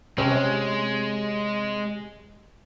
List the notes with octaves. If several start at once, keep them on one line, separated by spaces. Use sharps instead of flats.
C3 G#3 C#4